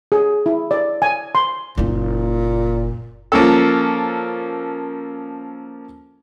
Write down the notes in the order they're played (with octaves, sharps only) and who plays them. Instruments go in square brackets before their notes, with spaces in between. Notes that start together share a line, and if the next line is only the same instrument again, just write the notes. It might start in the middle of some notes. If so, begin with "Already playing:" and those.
[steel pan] G#4
E4
D5
G#5
C6
[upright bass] F#1 D#4 [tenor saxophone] A#2
[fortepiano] F3 A#3 C#4 A4